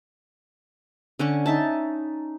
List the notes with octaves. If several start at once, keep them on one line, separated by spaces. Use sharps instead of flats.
D3 C#4 C#6
D#4 E5 A5